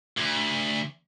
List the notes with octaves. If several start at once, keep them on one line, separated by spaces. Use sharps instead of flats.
D2